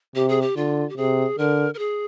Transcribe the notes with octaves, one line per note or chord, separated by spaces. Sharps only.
C3 G4
G#4
G4
D3 F4
G4
C3 G#4
D3 A#4
A#4
G#4